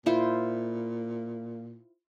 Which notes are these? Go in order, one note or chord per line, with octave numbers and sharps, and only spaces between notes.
A#2 E4 F4 C5